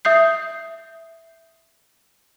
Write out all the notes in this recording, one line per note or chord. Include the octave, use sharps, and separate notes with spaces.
E5 D#6 G6 C7